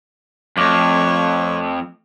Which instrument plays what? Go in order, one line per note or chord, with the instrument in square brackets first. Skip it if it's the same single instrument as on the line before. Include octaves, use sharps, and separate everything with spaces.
[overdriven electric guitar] F2 [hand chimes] A3 D6 [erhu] C#5